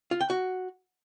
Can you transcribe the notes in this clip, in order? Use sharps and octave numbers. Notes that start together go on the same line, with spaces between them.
F4
G5
F#4